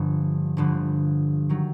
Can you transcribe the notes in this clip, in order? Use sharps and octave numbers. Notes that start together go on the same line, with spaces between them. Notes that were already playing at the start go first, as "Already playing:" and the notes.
Already playing: G1 G2 D3 F3
G1 G2 D3 F3
D#3 F#3